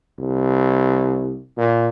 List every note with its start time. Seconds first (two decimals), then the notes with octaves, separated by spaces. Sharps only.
0.19 C2
1.57 A#2